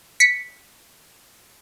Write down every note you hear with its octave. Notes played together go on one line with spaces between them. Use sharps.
B6 C#7